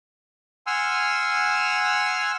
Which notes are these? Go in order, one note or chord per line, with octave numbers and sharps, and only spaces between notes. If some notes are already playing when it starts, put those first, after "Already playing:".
F#5 G#5 C6 E6 F6